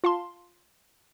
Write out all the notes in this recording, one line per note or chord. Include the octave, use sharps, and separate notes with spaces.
F4 F5 A5 C6